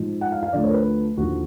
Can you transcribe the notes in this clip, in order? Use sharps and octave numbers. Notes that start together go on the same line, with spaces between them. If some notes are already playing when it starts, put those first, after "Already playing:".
Already playing: G#2 F3
F#5
F5
F5
D2 D3 F3 D5
C#5
A#4
B4
D#2 D3 F3 F#4